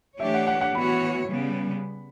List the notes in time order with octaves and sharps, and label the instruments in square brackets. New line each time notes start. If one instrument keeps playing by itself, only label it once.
[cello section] E3 A3 D4 G4 C#5 [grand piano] E5
[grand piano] F#5
F#5
F#5
[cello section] E3 B3 F#4 C#5 [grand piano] B5
[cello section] C#3 G3 B3